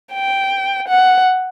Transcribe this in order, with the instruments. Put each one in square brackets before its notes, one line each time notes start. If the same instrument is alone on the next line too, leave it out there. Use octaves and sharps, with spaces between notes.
[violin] G5
F#5